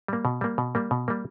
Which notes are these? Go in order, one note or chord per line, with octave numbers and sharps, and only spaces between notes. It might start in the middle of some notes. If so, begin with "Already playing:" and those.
G3 A#3
B2
G3 A#3
B2
G3 A#3
B2
G3 A#3